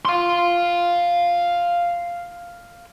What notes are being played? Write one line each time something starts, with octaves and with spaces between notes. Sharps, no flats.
F5 C6